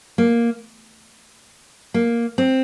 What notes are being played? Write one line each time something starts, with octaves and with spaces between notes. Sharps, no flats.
A#3
A#3
C4